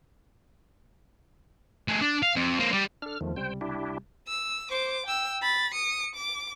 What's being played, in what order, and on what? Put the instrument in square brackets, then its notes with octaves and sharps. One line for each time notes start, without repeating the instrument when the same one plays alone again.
[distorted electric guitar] A3 G#4
D4
F5
F2
A#3 C4
G3 G4
[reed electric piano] D4 A4 [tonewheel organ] F6
[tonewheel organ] E2 F3 [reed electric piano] D#3 A3
[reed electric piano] C#2 C3 G3 [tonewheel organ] C5 G5
[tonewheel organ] D4 E4 G4
[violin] E6
C5 D6
G5 E6
B5 A6
D#6 C#7
D6